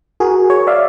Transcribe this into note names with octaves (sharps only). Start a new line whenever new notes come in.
F#4 G#4 A#4
C#5
D5 E5 F5